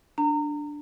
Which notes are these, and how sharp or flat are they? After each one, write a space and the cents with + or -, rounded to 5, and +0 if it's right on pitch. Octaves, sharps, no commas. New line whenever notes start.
D4 +0 A#5 -25